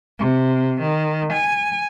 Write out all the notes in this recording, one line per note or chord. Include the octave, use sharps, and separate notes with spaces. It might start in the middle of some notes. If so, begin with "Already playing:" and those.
C3
D#3
G#5